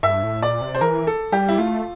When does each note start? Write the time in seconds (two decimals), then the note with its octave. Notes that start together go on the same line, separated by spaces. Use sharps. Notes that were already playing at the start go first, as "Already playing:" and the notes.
0.03 G2 E5
0.23 A2
0.42 A#2 D5
0.61 C3
0.75 C5
0.81 E3 A#4
1.07 A4
1.32 G3 G4
1.48 E4
1.58 A3 F4